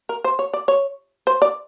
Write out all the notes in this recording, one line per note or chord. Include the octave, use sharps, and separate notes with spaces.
A#4
C5
C#5
D5
C#5
C5
D5